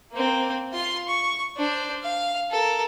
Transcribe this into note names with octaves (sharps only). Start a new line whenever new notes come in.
A#3 C4
F4 C6
C#6
D4 C5
F5
A4 A#4